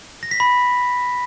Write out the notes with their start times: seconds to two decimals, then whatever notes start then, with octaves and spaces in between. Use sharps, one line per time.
0.23 A#6
0.31 B6
0.40 B5